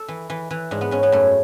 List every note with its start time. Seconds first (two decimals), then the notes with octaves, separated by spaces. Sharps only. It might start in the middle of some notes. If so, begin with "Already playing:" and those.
Already playing: A4
0.08 E3
0.30 E3
0.51 E3
0.71 G#2 D4
0.81 B3
0.91 G#2 C#4
1.03 B3
1.12 F#2 A3